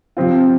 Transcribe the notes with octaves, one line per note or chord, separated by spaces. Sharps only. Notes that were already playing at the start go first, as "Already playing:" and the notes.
C3 F3 C4 F4